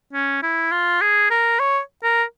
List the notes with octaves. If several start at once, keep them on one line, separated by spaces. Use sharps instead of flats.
C#4
E4
F4
G#4
A#4
C#5
A#4